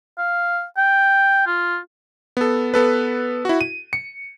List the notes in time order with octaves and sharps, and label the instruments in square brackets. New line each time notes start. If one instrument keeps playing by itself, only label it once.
[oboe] F5
G5
F4
[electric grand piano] B3 A4
B3 A4 B4
E4 F#4
D#7
C#7